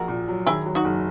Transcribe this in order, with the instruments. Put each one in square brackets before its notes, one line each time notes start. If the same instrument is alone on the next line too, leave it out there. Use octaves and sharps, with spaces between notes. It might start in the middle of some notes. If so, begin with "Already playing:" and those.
Already playing: [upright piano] A#1 [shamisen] F#4 A#4
[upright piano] A#2
F#3
[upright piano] D#3 [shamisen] E4 G#4
[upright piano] F#3
[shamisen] D#4 F#4
[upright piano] F#1